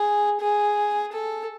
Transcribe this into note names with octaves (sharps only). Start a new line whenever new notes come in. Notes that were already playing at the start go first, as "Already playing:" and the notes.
Already playing: G#4
G#4
A4